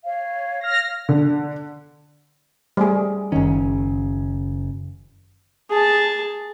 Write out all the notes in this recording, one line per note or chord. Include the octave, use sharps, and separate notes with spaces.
C#5 F5
F6 A#6
D3
G3 A3 G#4
F#1 D#3 C#4
G#4 A5